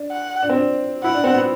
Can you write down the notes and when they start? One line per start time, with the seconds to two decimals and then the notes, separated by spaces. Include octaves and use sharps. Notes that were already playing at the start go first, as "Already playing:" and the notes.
Already playing: D4
0.12 F#5
0.43 D4
0.49 C4
0.58 D4
1.04 E4 F#5
1.14 D4
1.24 C4
1.34 B3